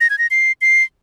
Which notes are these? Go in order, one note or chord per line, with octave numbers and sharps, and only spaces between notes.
A#6
G#6
A#6
C7
C7